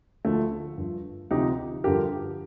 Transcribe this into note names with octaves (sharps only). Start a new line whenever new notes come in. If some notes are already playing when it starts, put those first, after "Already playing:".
D2 D3 F3 A3
G2 F3
D2 C3 F3 D#4 G4
G2 D3 F3 G4 A#4